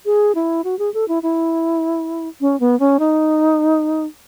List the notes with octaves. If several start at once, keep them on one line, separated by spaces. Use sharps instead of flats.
G#4
E4
F#4
G#4
A4
E4
E4
C#4
B3
C#4
D#4